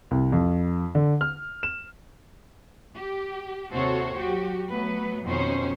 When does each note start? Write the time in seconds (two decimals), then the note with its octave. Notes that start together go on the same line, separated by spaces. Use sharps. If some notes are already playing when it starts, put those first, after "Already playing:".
0.11 C2
0.32 F2
0.95 D3
1.21 F6
1.63 E7
2.94 G4
3.71 D#2 C3 F#4 A4 C5 C#5
4.16 F#3 F#4 G4
4.69 F#3 A3 B3 B4
5.24 F2 B2 D#3 C#4 C5 C#5